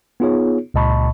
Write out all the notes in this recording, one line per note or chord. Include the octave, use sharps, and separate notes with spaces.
B3 D#4 F4 G#4 C#5
C#2 A#2 D#5 A5 B5 C#6